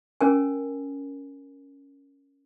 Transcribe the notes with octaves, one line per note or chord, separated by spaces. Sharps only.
C#4 A#4 G#5